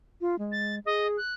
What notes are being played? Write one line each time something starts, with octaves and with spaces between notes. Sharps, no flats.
F4
G#3
A6
G#4 D#5
F#6